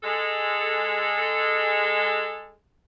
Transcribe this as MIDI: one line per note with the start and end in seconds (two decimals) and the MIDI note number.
0.02 2.54 56
0.02 2.54 69